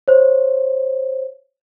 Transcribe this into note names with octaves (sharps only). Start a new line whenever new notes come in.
C5 C#5